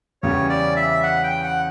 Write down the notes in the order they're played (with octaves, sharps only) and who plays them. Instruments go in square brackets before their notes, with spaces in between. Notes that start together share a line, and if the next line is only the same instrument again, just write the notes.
[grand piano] E2 C#3 G3 C#4 G4 [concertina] C#5
[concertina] D5
E5
F#5
G5
F#5